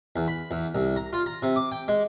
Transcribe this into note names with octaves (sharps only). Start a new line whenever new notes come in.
E2
B5
E2
C2
A#5
F4
A#5
C3
D6
G5
G#3